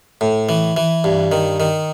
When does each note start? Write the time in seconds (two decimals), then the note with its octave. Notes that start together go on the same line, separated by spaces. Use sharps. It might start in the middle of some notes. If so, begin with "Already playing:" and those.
0.21 A2
0.49 E3
0.77 E3
1.04 G2
1.32 D#3
1.60 D#3